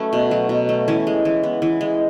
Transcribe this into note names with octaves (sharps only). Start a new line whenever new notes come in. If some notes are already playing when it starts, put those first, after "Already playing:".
Already playing: F#3 A3 C#4 B4
B2
F#3
B2
A3
E3 C#4
G#3
E3
B3
E3
G#3